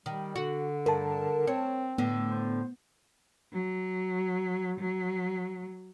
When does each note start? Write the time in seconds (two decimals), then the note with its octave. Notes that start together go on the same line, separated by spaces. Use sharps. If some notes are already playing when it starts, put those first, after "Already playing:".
0.06 D#3 G3
0.36 D3 F#4
0.86 G2 A#4 A5
1.47 C4 C#5
1.98 A2 D3 B3
2.30 C5
3.53 F#3
4.80 F#3